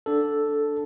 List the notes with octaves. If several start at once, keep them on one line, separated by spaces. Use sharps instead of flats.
D4 A4